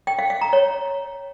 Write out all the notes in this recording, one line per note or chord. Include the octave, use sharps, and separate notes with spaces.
G5
F5
F5
A#5
C#5